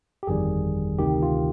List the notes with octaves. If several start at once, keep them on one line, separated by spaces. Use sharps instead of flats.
G4
G1 F2 D#3 G3 G#4
D2 C3 D#3 G4
F4